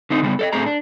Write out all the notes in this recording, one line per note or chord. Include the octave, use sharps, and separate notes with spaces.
D3 C4 D#4
C#3 G3 B3
A4 D5 D#5
A2 A3 C4 G#4 A#5
D4